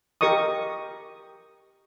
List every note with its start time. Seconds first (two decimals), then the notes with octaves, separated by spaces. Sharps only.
0.21 G4 A#4 D#5 C#6 D#6